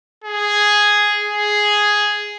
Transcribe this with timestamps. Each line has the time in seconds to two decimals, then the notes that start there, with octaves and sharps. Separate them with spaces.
0.24 G#4
1.24 G#4